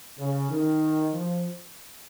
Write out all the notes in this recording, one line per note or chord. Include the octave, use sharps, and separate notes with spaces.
C#3
D#3
F3